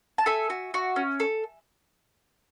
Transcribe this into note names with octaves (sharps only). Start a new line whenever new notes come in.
A5
A4 E5 G#5
F#4
F#4
C#4
A4